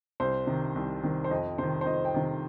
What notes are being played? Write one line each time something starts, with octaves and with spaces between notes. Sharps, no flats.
C2 C5
C3 D#3
C2
C3 D#3
C5
F2 D#5
C3 D#3 C5
C5
F2 D#5
G5
C3 D#3